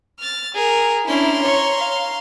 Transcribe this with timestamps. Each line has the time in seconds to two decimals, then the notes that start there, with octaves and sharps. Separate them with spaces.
0.19 F6 A6
0.54 G#4 A#4
1.07 C#4 D4 E4 A#5 C6
1.43 C#5 C#6
1.79 F5